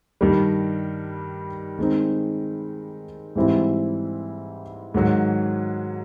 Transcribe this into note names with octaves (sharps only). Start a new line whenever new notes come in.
G2 D#3 G3
D#3 G#3 C4 D#4
G#2 E3 G3 C4 E4
G#2 D#3 F#3